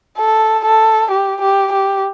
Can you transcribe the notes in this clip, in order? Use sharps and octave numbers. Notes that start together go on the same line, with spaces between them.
A4
A4
G4
G4
G4